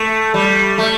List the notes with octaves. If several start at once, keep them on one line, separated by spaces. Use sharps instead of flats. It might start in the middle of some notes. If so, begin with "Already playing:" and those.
Already playing: A3
G3
A3